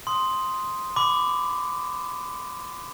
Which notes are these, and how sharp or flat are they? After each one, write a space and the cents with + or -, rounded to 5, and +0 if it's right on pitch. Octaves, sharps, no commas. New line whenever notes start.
C6 +0 D#6 +0
B5 +30 D6 +0